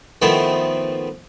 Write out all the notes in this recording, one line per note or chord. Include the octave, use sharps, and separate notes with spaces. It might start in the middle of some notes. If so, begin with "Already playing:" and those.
D#3 F3 A3 B3 C4 E4